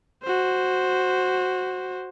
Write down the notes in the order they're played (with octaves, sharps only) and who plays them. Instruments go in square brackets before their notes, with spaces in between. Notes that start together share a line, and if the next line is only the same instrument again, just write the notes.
[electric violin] F#4 C5